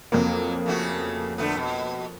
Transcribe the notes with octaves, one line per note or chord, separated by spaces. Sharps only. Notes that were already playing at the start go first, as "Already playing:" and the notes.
F2 F#3 A#3
C#3 A3 F#4
D3 A3 B3
B2